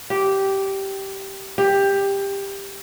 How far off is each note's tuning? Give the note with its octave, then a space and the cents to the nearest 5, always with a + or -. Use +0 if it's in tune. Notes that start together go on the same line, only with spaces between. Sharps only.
G4 -10
G4 +15